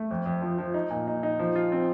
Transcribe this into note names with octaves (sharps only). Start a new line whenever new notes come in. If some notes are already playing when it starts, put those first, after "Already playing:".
Already playing: A3
F2
F2
F3
F3
D#4
A#2
D#4
D#4
F3
F4
C4